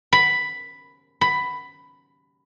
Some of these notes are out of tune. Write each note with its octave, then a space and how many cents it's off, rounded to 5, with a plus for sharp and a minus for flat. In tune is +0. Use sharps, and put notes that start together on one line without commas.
B5 +5
B5 +10